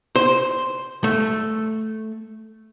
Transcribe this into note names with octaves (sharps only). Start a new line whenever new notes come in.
C5
A3